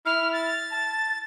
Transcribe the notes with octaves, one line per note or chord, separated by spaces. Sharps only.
E4 F6
A6
A5